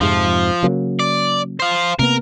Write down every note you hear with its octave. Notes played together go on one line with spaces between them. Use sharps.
F2 G#2 C3 F3
C#3 F#3 A#3
D5
C5 F5
C3 A#3 B3 A#4